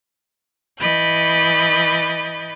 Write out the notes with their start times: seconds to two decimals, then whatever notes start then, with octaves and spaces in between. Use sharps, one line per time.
0.81 E3 D#5 B5 G6 A6